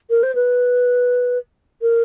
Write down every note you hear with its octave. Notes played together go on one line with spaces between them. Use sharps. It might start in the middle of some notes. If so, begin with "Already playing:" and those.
A#4
C5
B4
A#4